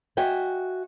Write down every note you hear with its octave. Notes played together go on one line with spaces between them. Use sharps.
F#4 D#5 E5 G5 G#5